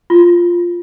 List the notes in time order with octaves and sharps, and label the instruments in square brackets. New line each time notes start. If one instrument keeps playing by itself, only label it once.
[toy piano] F4